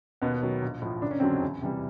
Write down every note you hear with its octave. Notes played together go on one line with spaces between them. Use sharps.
D#2 B2 B3
D#3 F#3
A#1
A2 F3
F#1 D4
C#4
F2 D3 F#3 C4
C#3 C#4
E2
C3 E3 G3